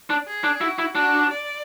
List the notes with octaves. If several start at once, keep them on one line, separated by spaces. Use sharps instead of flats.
D4
G#4
D4
E4 F#4
E4
D4 F#4
D5